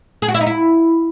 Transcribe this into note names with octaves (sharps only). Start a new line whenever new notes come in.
G#4
F#4
E4
D#4
E4